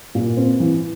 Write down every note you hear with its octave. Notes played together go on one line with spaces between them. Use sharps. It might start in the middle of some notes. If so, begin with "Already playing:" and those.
A#2
C4
E3